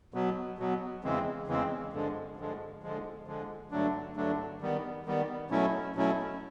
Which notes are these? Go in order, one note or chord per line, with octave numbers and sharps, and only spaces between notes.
B2 F#3 B3
B2 F#3 B3
E2 C#3 E3 G#3 C4
E2 C#3 E3 G#3 C4
G2 D3 F3 G#3
G2 D3 F3 G#3
D3 F3 G#3
D3 F3 G#3
G2 D3 F#3 A3 D4
G2 D3 F#3 A3 D4
D#3 G3 B3
D#3 G3 B3
B2 F#3 A3 C#4 E4
B2 F#3 A3 C#4 E4